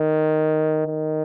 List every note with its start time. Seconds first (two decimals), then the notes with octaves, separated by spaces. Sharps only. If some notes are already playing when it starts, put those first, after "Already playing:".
Already playing: D#3
0.86 D#3